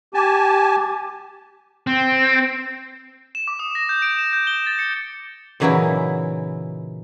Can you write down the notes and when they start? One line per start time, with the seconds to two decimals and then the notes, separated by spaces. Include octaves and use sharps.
0.14 G4 G#5 A5
1.87 C4
3.35 E7
3.48 D6
3.59 D#6
3.75 A#6
3.89 G6
4.02 D7
4.19 E7
4.33 G6
4.47 G7
4.67 A6
4.79 C#7
5.60 A#2 C#3 E3 F#3 D#4 E4